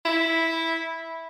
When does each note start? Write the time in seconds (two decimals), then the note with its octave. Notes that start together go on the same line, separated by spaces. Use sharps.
0.05 E4